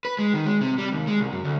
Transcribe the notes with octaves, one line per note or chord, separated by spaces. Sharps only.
B4
G#3
D#3
G#3
C3
G3
D#2
G#3
C2
F#2
D2